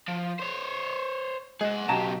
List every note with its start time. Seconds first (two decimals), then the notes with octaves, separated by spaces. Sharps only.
0.08 F3
0.39 C5 C#5
1.61 G#3 G#4 F#5
1.88 B1 C#3 G4 A5 A#5